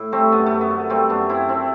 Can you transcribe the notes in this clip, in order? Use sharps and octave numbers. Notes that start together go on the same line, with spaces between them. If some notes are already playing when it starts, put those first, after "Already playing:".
Already playing: A2 E4
G3 A3 C4
F#2 B3
F#2 A3
B3
D3
G3 A3 C4
F#2 B3 D4
F#2 C4 E4
C3 C4 E4